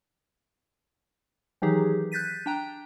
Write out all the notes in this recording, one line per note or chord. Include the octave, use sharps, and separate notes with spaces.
D#3 E3 F#3 D#4 G4 G#4
F#6 G6 A6 B6 D#7
D4 G5 A#5